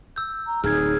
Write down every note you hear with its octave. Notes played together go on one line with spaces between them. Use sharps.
E6 G6
A#5
D1 D#4 G#4 F6 G#6